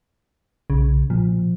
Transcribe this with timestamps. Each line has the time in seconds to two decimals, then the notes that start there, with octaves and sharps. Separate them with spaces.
0.70 B1 C#3
1.10 A#2 F3